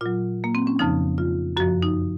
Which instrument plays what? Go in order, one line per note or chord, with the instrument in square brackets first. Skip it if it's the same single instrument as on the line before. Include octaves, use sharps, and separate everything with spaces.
[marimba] A#2 F#3 F4
A#3
C4
C#4
F2 C#3 F3 D#4
F4
F#2 F#4
F3
D#4